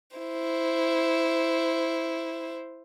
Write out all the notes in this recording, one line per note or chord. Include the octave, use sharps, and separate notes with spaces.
E4 C5